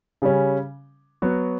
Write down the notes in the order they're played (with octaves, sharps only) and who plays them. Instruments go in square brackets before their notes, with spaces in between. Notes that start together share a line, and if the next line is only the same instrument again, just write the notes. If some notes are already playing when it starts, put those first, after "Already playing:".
[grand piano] C#3 G3 C#4
F#3 B3 F#4